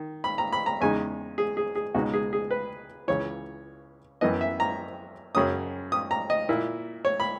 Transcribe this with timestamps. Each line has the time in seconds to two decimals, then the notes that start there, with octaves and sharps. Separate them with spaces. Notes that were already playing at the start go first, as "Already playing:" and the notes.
Already playing: D#3
0.24 B5
0.38 A#5
0.53 B5
0.66 A#5
0.81 E2 C#3 G#3 D#4 G#5
1.38 G#4
1.57 G#4
1.75 G#4
1.95 C#2 B2 G#3 D#4 F#4
2.14 G#4
2.33 G#4
2.51 B4
3.08 C#2 C#3 E3 C#5
4.21 F#2 E3 B3 D#5
4.41 E5
4.60 A#5
5.35 F#2 C#3 F#3 C#4 D#6
5.92 D#6
6.11 A#5
6.30 D#5
6.49 A#2 A#3 E4
7.05 C#5
7.20 B5